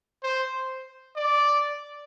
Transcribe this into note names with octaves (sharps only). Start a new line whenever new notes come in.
C5
D5